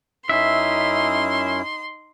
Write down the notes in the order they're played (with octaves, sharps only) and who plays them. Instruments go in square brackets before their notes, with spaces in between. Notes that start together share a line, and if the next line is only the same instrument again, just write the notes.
[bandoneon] F#2 C#4 E4 [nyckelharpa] D#4 [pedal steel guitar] E5 [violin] C6